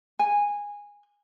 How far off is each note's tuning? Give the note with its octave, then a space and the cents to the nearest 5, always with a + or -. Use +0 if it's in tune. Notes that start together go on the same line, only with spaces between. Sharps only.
G#5 -15